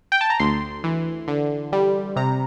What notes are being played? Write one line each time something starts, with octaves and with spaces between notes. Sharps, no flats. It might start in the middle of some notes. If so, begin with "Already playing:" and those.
G5
A5
A#5
D2 C6
E3
D3
G3
C3 A#5